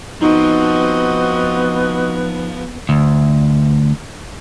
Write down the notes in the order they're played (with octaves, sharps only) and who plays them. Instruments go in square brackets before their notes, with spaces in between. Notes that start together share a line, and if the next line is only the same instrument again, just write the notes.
[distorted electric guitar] F3 [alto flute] B3 [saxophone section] C4 F#4 D#5 [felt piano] D#4
[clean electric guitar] D2